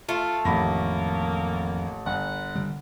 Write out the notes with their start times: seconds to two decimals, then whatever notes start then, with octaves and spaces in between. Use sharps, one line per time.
0.09 A3 F4
0.45 A1 F2 D#3 A#3 B5 A#6
2.06 G1 F#5
2.55 D3 G3